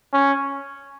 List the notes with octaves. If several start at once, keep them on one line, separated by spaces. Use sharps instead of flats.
C#4